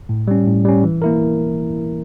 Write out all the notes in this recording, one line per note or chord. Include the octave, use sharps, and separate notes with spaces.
A2
G3 C#4
A2
G3 C#4
E3
A#3 E4 A#4